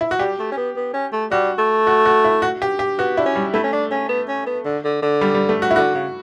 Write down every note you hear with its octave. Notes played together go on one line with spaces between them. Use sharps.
E4
F#4
G3 G4
A3
C#4
B3
B3
C#4
A3
G3 F#4
A3
F#4
F#4
E4
F#4
G4
G4
B3 F#4
D4 E4
C#4
G3
A3 E4
C#4
D4
C#4
B3
C#4
B3
D3
D3
D3
G3
G3
A3
F#4
E4
D3 F#4
C#3